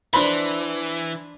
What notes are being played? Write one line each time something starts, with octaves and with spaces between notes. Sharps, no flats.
E3 D4 C5 B5